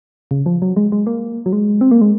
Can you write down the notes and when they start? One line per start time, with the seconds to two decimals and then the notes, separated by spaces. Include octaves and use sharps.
0.31 C#3
0.46 F3
0.62 F#3
0.76 G#3
0.92 G#3
1.07 A#3
1.46 F#3
1.53 G#3
1.81 C4
1.91 A#3
2.01 G#3